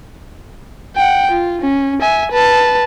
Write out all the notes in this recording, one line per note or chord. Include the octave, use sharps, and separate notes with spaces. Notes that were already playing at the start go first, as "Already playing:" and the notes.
F#5 G5
F4
C#4
E5 G#5
B4 A5